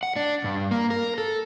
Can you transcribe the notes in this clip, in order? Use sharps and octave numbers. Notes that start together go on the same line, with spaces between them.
F#5
D4
G2
A#3
A#4
A4